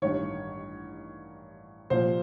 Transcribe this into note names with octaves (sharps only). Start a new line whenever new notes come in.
A1 G2 D#3 C#5
C2 A#2 F3 C5